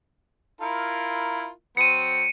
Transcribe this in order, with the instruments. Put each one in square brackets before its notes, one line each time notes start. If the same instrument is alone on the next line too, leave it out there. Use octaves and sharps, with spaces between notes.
[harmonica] E4 F4 A#4
[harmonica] F#3 C4 [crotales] C#7 D#7